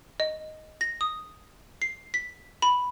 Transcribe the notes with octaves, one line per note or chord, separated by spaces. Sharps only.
D#5
A#6
D#6
C7
B6
B5